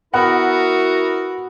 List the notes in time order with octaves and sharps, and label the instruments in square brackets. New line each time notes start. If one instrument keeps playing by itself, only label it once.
[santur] B3 [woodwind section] E4 A#4 [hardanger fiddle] F#4 [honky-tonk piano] F#5